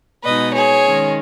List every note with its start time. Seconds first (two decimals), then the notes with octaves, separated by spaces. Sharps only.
0.23 B2 G#3 B3 D#4 B4 D#5
0.54 G#4 C#5
0.85 D#3 G#3 C#4